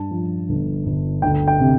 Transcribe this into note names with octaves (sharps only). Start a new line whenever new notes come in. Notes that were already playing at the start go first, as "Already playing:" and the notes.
Already playing: G2 A5
F3
G1
G1
D2 G5
G5
C3